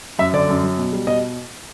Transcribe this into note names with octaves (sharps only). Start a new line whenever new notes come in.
F#2 E5
D3 D5
F#2
F#3
B2
G3
B2 D#5